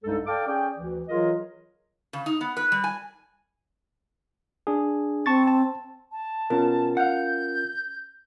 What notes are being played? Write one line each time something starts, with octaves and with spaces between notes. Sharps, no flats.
C2 G2 G#3 D#4 A4
A4 D5 F5 G5 A5 D6
C#4 G#4 D5 G5
D2 E3
E3 F#3 F4 G#4 A#4 D#5
C#3
D#4
B3
B4
G3
G#5
D4 G#4
C4 A5 C#6 A6
A5
A5
B2 C#4 F4 A#4
F5 F#5 G6